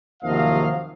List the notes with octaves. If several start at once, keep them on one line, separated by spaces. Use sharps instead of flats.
D#2 C3 F3 F#3 D#5 F5